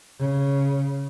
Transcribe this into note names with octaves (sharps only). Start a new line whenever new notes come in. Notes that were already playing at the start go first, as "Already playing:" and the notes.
C#3